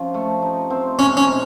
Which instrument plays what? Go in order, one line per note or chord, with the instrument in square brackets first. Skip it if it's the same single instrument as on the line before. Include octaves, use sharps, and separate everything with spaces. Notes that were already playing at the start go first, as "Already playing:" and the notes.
Already playing: [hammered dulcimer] C3 F3 C#4
A3
D#4
C4
[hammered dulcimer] C3 [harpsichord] C#4
[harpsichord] C#4
[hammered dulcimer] D#4